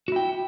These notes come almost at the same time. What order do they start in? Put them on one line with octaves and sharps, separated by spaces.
F#4 E4 G5